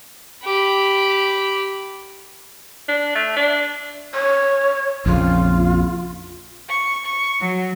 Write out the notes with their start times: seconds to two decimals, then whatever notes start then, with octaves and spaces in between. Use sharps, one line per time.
0.44 G4 B5
2.88 D4
3.15 A3
3.36 D4
4.14 C#5
5.06 A#1 F2 C#3 F4
6.67 C#6
7.05 C#6
7.40 F#3